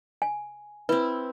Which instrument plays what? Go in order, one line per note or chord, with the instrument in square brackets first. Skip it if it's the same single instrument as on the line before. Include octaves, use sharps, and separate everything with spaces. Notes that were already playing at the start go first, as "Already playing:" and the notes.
[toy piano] G#5
[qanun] C4 E4 [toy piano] B4